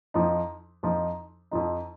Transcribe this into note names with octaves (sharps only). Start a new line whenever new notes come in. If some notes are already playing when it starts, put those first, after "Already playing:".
F2 F3 D#4
F2 F3 D#4
F2 F3 D#4